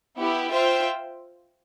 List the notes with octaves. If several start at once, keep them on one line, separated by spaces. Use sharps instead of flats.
B3 E4 G4
F4 C5 E5 G5